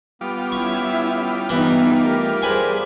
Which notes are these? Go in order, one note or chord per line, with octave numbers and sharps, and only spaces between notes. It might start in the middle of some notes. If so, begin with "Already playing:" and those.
G3 B3 F4 D6
C#4 E4 E5 C#6
G2 E3 B3 D#4
A3 G4 A#4
G#4 B4 C5 D5 G#5